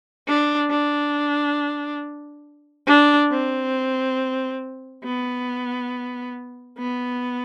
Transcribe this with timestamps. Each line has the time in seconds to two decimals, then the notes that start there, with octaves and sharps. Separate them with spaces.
0.27 D4
0.70 D4
2.87 D4
3.31 C4
5.04 B3
6.78 B3